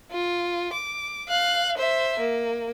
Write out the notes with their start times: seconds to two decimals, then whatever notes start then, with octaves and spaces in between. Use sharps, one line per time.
0.11 F4
0.73 D6
1.29 F5 F#6
1.77 C5 E5
2.19 A#3